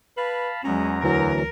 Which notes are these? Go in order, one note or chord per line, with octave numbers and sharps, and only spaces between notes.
B4 F5 A5 B5
E2 F#3 G#3 C#4 A#5
D2 E3 F#3 E4 A#4